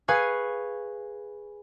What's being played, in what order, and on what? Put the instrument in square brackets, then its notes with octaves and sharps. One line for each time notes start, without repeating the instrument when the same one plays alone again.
[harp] G#4 B4 F5 G#5 C#6 G#6